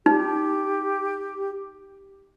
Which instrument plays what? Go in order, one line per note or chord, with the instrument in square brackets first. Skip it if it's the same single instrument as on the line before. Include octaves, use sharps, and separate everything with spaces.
[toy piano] D#4 [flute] G4